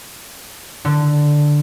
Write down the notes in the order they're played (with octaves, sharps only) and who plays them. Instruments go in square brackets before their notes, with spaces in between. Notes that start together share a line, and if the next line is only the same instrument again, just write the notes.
[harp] D3